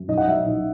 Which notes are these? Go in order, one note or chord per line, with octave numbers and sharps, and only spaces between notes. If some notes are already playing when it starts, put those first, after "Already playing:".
Already playing: F#2
B1 D#5
F#5
F#3 E5
D#5
B1